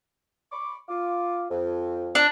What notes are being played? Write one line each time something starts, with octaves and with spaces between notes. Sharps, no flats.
B5 C#6 D6
F4 D6
F2
D4